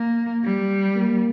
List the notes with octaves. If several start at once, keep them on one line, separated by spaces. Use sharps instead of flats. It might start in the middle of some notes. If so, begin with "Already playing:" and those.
Already playing: A#3
G3
A#3